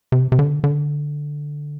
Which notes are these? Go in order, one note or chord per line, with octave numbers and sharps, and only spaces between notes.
C3
C3
D3
D3